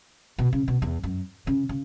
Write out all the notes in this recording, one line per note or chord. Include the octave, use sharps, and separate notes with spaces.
B2
C#3
B2
E2
F#2
C#3
C#3